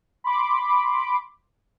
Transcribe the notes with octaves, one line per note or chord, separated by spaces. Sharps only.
B5 C6 D6